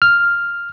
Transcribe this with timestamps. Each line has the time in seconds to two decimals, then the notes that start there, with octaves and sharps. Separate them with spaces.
0.02 F6